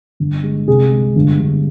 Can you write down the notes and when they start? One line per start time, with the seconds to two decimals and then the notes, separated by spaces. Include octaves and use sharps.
0.20 G1
0.43 G#3
0.67 C2 G#4
0.91 G#3
1.16 G1
1.40 G1